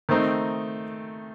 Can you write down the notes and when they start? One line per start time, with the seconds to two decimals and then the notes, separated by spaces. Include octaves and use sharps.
0.09 D#3 A3 C4 D#4